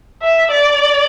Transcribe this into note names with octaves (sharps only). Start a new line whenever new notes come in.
E5
D5